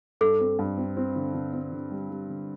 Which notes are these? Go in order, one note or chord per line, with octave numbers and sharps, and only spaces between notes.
G2 A4
C4
G2
C4
C4
D3
D3
C4
D3
G3
G3
D3